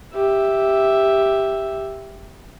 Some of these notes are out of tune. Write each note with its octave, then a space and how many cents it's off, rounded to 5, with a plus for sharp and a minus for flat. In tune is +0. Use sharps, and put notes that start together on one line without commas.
G4 +5 E5 +0